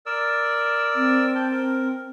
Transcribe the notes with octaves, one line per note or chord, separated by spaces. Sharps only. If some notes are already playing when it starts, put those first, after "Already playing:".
A#4 D5 E6
C4
G5 A5
A#4